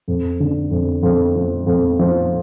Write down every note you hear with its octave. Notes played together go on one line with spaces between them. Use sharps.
F2
D3
F2
F2
F3
F2
F3